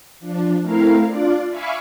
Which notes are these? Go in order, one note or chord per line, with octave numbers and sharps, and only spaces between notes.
F3 D4
A3 C4 E4 A#4 F5
D4 F4 D5
E5 F5 G#5 B5 C#6 D6